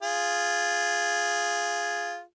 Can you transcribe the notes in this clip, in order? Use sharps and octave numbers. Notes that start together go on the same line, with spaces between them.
F4 G#4